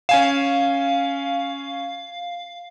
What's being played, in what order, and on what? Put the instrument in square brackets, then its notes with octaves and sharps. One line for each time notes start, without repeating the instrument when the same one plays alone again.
[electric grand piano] C#4 G#5 E7 [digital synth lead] F5